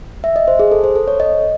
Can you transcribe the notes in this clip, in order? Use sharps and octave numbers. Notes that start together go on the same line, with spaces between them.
E5
D#5
C5
G#4
A4
C5
A4
C#5
D#5